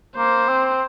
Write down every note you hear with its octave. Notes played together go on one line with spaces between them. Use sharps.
A#3 C5
C4